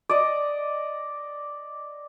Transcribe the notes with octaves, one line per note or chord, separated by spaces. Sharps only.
D5 D#5